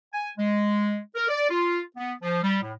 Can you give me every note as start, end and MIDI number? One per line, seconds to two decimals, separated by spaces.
0.13 0.29 80
0.38 0.98 56
1.15 1.26 70
1.29 1.48 74
1.50 1.80 65
1.97 2.13 59
2.22 2.41 53
2.43 2.59 55
2.62 2.72 45